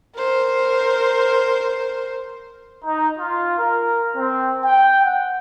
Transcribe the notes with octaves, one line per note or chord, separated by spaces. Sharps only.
A#4 C5
D#4
F4
A#4
C4
G5
F#5